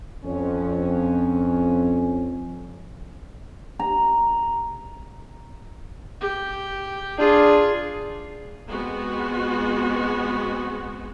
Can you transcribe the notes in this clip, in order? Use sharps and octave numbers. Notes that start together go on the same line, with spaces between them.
F2 C#4
A#5
G4
D4 F4 G#4
G#3 B3 C4 F#4